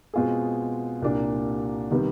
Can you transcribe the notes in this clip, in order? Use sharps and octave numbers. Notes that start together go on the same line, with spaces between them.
B2 G#3 C4 F4 G#4
C2 A#2 G3 A#3 D4
C3 D#3 G3 B3